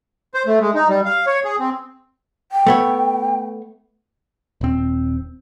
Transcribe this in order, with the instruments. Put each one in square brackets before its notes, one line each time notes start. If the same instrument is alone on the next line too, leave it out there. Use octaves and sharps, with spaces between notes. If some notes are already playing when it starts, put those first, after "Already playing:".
[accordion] C5
A3
G#3
D#4
G3
F5
C#5
G#4
C4
[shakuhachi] G5
[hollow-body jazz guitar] A3 B3 C#5
[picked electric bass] D#1 C4